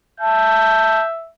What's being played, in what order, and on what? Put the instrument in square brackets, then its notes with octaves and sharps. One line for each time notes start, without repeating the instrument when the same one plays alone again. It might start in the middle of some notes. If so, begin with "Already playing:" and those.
[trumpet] E5 [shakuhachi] A5 [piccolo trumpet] G6